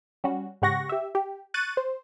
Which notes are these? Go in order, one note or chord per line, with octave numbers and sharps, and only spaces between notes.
G3 C#4 F#4
G#2 C#3 G4 F#5 C#6 A#6
G4 E5
G4
C#6 F#6 A6 D#7
C5